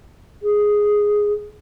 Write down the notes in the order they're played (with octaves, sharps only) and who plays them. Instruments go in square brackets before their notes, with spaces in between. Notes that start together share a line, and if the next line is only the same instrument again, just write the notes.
[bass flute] G#4